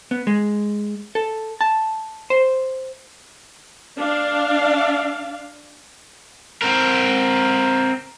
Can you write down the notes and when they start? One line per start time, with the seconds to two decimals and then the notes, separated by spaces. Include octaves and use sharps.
0.11 B3
0.27 G#3
1.15 A4
1.61 A5
2.30 C5
3.97 D4 F5
6.62 C4 A#4